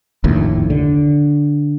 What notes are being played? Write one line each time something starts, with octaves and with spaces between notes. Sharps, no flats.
F1 A#1 D#2 A2
D3